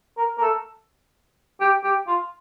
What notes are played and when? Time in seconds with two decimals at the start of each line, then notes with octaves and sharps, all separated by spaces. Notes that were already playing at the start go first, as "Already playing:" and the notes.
0.18 A#4
0.38 A#4
0.42 A4
1.60 G4
1.83 G4
2.07 F4